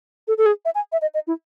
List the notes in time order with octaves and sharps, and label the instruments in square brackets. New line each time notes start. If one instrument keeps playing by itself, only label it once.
[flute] A4
A4
G#4
E5
G#5
E5
D#5
D#5
E4